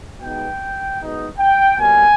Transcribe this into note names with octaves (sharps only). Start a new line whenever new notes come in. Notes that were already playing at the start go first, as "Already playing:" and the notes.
B2 G#3 B3 D#4 G5
B2 G#3 B3 D#4
G5
B2 G3 A#3 C#4 G#5